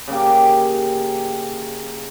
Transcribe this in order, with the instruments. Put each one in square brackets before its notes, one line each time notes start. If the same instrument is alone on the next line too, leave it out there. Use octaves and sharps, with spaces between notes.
[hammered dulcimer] C#3 A#3 G4